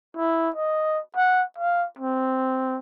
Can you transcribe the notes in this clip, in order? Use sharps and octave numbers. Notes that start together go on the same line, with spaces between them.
E4
D#5
F#5
F5
C4